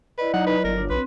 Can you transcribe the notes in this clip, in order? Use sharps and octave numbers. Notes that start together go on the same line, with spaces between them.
E4 B4 D5 D#5
F#3 D#4 F#5
B4
G1 A#4
D4 F4 C#5
B1 C4 B4 C6